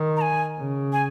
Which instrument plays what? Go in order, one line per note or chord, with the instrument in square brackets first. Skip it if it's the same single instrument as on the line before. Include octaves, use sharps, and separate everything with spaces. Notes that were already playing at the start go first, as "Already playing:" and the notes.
Already playing: [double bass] D#3
[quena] A#5
G#5
[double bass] C#3
[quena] G#5